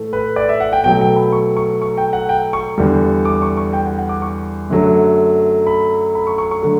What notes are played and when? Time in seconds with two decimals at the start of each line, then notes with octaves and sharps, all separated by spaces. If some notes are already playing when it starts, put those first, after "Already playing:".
Already playing: A2 E3 A3
0.13 B4
0.36 D5
0.49 E5
0.60 F#5
0.73 G5
0.84 B2 F#3 A3 G5
1.01 G5
1.16 B5
1.32 C#6
1.56 C#6
1.81 C#6
1.98 G5
2.13 F#5
2.29 G5
2.53 C#6
2.78 E2 D3 G3
3.25 D6
3.42 C#6
3.57 C#6
3.73 G5
3.86 F#5
3.98 F#5
4.09 D6
4.22 C#6
4.70 F#2 D3 F#3 A3
5.67 B5
6.15 B5
6.27 C#6
6.38 C#6
6.51 C#6
6.63 D3 F#3 A3